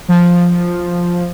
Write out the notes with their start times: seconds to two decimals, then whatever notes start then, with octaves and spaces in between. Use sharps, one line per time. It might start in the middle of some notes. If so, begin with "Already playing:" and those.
0.09 F3